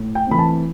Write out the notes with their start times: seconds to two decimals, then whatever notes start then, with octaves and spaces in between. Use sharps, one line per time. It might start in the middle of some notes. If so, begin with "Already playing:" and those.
Already playing: A2
0.15 G5
0.27 E3 A3 C4 B5
0.39 A5